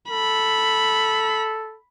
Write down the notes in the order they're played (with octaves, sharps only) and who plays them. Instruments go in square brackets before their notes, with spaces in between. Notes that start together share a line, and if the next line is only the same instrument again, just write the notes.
[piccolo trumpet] A4 [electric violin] B5